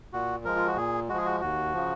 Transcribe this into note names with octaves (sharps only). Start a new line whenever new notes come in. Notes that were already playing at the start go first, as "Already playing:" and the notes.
A#2 F#4
F3 G#3 A#4
F4
F#4
A#2 G#4
F3 G#3 F#4 G#4
F#4
D#2 F#4
C#3 F3